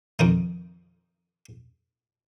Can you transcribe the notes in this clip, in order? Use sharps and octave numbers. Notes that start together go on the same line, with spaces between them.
F2 D#3 D#4